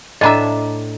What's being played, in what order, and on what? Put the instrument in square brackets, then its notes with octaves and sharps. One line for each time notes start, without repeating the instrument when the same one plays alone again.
[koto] A2 D4 E5 [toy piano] D#5 A5 A#5